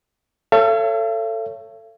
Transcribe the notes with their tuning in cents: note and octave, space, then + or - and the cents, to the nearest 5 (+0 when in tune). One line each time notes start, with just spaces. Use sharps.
A4 +15 C#5 +0 F5 -45